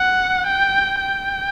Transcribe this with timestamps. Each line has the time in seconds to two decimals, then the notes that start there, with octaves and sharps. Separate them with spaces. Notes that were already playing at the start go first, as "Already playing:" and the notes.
Already playing: F#5
0.47 G5
1.01 G5